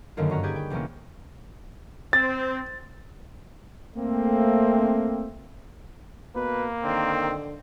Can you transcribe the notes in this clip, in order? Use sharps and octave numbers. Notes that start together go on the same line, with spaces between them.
F#2 D3 D#3 A#3 F4
G2 C#4 F#4 A#5
G4 G#4 B4 D5 G#6
G5
E2 C3 G3 A#3 C#4
C4 A6
A3 A#3 C4
B2 A#3 B4
D3 D#3 C4